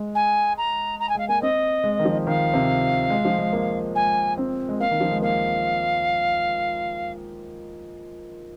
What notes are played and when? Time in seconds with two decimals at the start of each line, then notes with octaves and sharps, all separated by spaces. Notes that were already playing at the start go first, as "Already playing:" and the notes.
Already playing: G#3
0.15 G#5
0.57 A#5
0.99 A#5
1.09 G#5
1.15 G#3 F5
1.28 A#3 G#5
1.42 C4 D#5
1.84 G#3
1.99 D#3
2.05 F3
2.26 D#3 F5
2.54 C3
3.10 G#3
3.25 F3
3.39 G#3
3.53 A#3
3.95 G#3 G#5
4.38 C4
4.69 G#3
4.80 A#3 F5
4.91 D#3
5.00 F3
5.11 G#3
5.22 A#3 F5